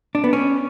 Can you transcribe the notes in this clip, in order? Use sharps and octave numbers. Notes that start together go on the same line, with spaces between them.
D4
B3
C#4